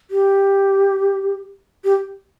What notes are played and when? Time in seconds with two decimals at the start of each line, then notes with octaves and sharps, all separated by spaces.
0.11 G4
1.84 G4